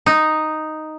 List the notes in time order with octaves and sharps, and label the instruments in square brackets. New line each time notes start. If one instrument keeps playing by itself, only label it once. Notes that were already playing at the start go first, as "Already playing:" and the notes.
[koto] D#4